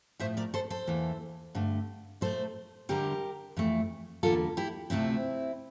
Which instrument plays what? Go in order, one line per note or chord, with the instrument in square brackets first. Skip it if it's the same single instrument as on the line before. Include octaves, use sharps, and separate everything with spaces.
[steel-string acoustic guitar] A2 F3 A3 C5 E5
A#4 D5
A4 C5
A4 C5
E2 E3 A#3
G2 D3 A3
A#2 A3 A4 C5
E2 D3 G3 G4 A#4
F2 E3 A3
E2 D3 G3 A#3 F4 A4
E4 G4
D2 C3 F3 A3 C4 E4